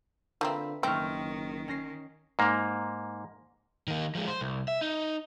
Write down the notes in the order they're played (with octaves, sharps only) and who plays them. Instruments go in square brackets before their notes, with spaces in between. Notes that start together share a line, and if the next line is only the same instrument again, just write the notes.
[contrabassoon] D3 [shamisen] F3 A#3 C4 [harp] B4 E5
[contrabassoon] F#1 [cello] D#3 [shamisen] A3 C4 [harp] G5 C#6 F6
[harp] C#4 A#6 C7
[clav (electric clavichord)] G#2 A#3
[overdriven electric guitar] D#3 A#3
F3 G#3
C5
C2
E5
D#4